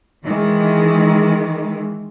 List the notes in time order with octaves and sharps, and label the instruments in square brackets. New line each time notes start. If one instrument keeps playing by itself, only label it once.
[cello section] D#3 E3 G#3